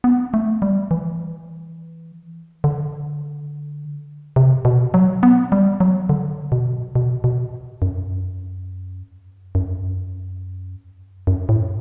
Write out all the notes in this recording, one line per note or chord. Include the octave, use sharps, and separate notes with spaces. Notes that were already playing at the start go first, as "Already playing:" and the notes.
B3
A3
G3
E3
D3
C3
B2
F#3
B3
G3
F#3
D3
B2
B2
B2
F#2
F#2
F#2
A2